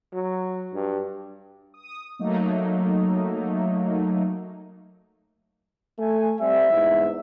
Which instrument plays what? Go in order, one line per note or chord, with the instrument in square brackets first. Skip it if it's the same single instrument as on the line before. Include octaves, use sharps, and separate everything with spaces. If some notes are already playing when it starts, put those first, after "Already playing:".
[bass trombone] F#3
G2
[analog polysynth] D#6
F#3 A3 A#3 D#4
[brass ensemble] A3 G#5
[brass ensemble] G3 C4 [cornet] E5
[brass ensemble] E2 G#2 E3